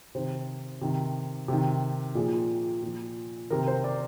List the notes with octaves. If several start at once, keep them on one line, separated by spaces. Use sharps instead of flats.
C3 D#3 C5
C3 D#3
C3 D#3
A#2 F3 G#4
A#2 F3
C3 D#3 A#4
C5
D5